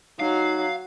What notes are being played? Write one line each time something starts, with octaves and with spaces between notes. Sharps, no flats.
F#3 D#4 F5